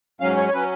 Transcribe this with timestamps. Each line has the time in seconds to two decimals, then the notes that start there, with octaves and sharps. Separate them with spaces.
0.21 G#2 F#3 C#4 F5
0.37 C#5
0.49 C#5
0.53 F#3 C#4 B4